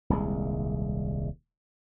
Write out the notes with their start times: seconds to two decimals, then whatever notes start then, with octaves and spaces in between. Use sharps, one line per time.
0.10 D#1 C2 G#3